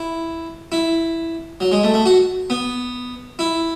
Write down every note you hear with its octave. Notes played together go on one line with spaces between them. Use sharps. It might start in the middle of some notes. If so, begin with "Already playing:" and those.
Already playing: E4
E4
F#3
G#3
A3
A3
F#4
B3
E4